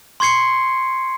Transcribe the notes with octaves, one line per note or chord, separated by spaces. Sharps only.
C6 C#6 G#6 C7 C#7